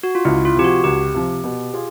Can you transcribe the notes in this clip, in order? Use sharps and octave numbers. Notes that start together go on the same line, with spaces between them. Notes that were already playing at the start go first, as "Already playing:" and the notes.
F#4
F4
C#2 E4
F4
C3 F3 G4
F#4
C#2 G4
C3 F3
B2
F4 G#4